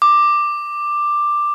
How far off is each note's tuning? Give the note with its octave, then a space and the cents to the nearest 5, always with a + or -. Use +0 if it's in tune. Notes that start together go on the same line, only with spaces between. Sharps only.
D6 +10